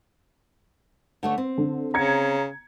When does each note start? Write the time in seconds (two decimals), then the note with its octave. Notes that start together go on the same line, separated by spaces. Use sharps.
1.23 D3 A3 C#5
1.38 C4
1.58 D3
1.94 C#3 A#5 G#6 C#7